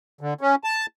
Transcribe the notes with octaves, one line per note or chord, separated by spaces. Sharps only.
D3
C#4
A5